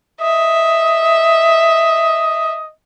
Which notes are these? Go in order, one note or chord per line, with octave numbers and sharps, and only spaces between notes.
D#5 E5